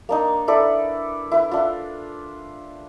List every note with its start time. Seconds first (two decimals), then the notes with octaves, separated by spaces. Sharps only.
0.09 A#3 D4 D#4
0.48 E4 A4 B4 D5
1.31 E4 B4
1.51 D4 F4